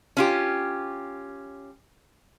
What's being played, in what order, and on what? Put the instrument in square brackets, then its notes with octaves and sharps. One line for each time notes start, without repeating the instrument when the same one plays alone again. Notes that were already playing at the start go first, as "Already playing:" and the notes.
[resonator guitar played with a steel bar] C#4 F4 G4